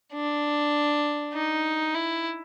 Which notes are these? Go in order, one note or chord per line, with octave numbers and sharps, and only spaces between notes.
D4
D#4
E4